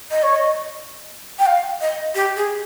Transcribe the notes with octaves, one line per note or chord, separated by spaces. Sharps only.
D#5
C#5
D#5
G5
F5
D#5
G4
G#4